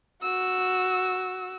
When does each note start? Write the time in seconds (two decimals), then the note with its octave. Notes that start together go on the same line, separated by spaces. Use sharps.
0.22 F#4 E6